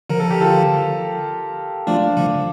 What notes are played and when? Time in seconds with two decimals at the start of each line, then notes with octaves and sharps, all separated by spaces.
0.10 D3 F3 A#4
0.20 A4
0.30 G4
0.41 F4 A4
1.87 F3 A3 D4 F4
2.17 D3 F3